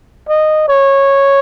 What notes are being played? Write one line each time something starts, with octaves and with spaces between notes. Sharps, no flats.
D#5
C#5